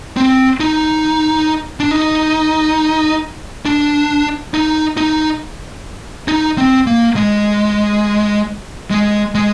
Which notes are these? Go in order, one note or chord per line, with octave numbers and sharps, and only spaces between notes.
C4
D#4
D4
D#4
D4
D#4
D#4
D#4
C4
A#3
G#3
G#3
G#3